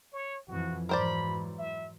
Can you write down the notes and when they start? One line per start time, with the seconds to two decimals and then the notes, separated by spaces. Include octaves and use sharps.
0.13 C#5
0.48 F2 E3 F3 F#4
0.89 G#2 E3 F#3 A#4 C5 D5 B5
1.59 E5